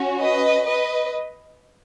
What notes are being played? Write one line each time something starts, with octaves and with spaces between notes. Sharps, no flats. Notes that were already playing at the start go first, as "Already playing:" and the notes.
Already playing: C#4 F#4
B4 D#5
B4 D#5